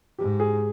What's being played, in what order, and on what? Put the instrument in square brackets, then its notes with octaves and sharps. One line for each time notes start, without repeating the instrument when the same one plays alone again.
[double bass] G#2 [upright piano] G4
[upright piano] G#4